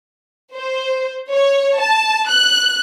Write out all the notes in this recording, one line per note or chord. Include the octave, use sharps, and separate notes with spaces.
C5
C#5
A5
F#6